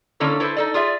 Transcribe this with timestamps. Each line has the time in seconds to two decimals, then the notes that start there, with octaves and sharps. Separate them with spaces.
0.20 D3 A#3 C#4 E4 A4
0.40 E4 A4 B4 C5
0.57 D#4 A4 D5
0.74 F4 G#4 D5 E5